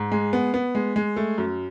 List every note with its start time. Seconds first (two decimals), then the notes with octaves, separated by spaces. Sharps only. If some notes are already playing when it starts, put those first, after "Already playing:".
Already playing: G#2
0.12 G#3
0.33 B3
0.54 B3
0.75 G#3
0.96 G#3
1.16 A3
1.38 F#2